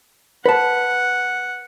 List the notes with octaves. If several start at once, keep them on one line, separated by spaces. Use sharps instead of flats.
B4 F#5 A5